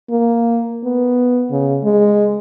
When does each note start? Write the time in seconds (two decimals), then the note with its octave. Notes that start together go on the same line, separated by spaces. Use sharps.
0.10 A#3
0.84 B3
1.51 C#3
1.83 G#3